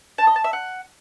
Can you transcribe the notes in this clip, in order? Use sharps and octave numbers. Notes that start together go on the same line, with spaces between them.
A5
D#5
A5
E5
F#5